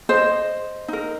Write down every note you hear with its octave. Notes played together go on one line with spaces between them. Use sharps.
C5 D#5
D#4 A#4